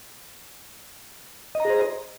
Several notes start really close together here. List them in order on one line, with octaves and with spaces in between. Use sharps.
D#5 A#5 G#4 C5